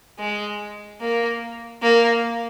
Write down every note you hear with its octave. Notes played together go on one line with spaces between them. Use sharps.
G#3
A#3
A#3